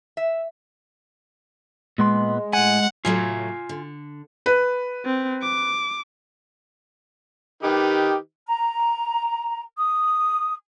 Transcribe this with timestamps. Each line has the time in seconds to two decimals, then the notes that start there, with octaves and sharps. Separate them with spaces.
0.17 E5
1.98 A#2 G#3 B3 C6
2.53 A2 F#5 G#5
3.05 A2 F#3 A3 F4 G#5
3.69 D3
4.46 B4
5.05 C4
5.42 D6
7.63 D#3 D#4 G4 B4
8.46 A#5
9.78 D#6